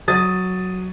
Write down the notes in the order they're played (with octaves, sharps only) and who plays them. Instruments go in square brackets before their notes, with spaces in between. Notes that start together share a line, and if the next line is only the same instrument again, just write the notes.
[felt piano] F#3 D#6 A6